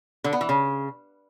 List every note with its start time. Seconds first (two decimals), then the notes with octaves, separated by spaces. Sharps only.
0.24 D3
0.33 B3
0.41 E3
0.49 C#3